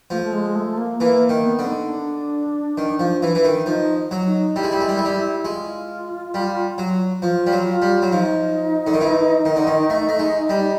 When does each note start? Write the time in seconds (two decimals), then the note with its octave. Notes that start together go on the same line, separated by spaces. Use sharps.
0.10 F3 A3
0.24 A3
0.33 G#3
0.55 A3
0.78 A#3
1.00 E3 A#3
1.21 A#3
1.29 D#3
1.44 B3
1.59 D3
1.67 D#4
1.89 D4
2.78 D#3
3.00 F3
3.23 E3
3.35 E3
3.44 D#3
3.66 F3 D#4
4.11 F#3
4.26 D#4
4.56 G3 E4
4.64 G#3
4.72 G3
4.81 G#3
4.89 G3
4.98 G#3
5.05 G3
5.45 G#3 F4
6.34 G3
6.78 F#3
7.22 F3 F4
7.46 G3
7.53 F#3
7.67 F4
7.82 G3
8.02 F#3
8.11 F3 D#4
8.87 D3
8.94 D#3
9.01 E3
9.45 D#3
9.56 D3
9.67 D#3
9.90 A3
10.09 A3
10.19 G#3
10.49 G3